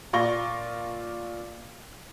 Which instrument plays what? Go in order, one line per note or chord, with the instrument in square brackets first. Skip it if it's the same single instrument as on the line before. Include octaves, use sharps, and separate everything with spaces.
[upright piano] A#2 F4 D5 C#6 A#6 G7